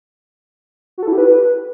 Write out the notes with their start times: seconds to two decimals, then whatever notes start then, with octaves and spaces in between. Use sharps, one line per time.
0.98 F#4
1.03 A4
1.08 E4
1.13 G4
1.18 B4